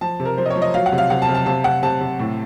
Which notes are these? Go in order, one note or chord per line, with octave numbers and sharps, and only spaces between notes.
F3 A5
C3
A#4
F3 C5
D#5
C#5
F3
D#5
F#3 F5
F#5
C3
F5
C3 F#5
A5
C3
A5
C3 A5
C3 F#5
C3 A5
C3
A2